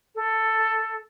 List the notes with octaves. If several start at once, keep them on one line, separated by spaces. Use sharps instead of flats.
A4